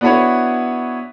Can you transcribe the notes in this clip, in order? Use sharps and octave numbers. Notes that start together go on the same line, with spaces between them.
B3 D4 E4 F#4 B4 C#5